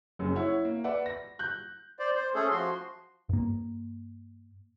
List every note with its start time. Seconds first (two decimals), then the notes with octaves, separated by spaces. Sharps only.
0.19 F#1 F#2
0.35 E4 C#5 F#5
0.65 A#3
0.84 B4 D5 E5 F#5
1.06 A#6
1.39 F#6 G6
1.99 C5 D5
2.16 C5
2.35 A3 C#4 G#4 A4
2.51 F3 F#4 C6
3.29 G2 A#3